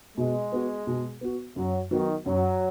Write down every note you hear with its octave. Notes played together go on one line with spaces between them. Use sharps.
B2 G#3
B3 F#4
B2
B3 F#4
F#2 F#3
D#3 F#3 B3 D#4 F#4
F#2 F#3